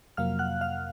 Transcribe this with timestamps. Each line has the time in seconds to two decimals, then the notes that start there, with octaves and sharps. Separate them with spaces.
0.17 F2 C3 F#3 A#3 F5 F6
0.39 F#5 F#6
0.61 F5 F6